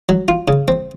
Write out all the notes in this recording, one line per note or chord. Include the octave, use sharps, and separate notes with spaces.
F#3
F4
C#3
C4